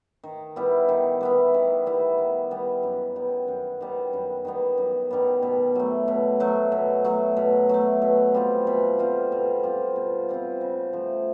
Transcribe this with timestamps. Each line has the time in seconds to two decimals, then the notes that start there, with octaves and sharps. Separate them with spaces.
0.23 D#3
0.56 G3 B3 E4
0.89 D#3
1.21 G3 B3 E4
1.54 D#3
1.86 G3 B3 E4
2.18 D#3
2.51 G3 B3 E4
2.83 F#2
3.16 D#3 G3 B3
3.48 F#2
3.81 D#3 G3 B3
4.13 F#2
4.45 D#3 G3 B3
4.78 F#2
5.11 D#3 G3 B3
5.42 B2
5.75 F#3 A3
6.08 B2
6.40 F#3 A3
6.72 B2
7.04 F#3 A3
7.37 B2
7.69 F#3 A3
8.02 B2
8.34 G3 C4 F4
8.67 B2
8.99 G3 C4 F4
9.32 B2
9.63 G3 C4 F4
9.96 B2
10.29 G3 C4 F4
10.61 C#3
10.93 F3 A3